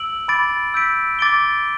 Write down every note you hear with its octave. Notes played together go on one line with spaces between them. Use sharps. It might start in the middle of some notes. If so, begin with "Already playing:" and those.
Already playing: E6 D7 F#7
B5 D6 A6 D7
E6 G6 B6 D7
D6 A6 D7 G7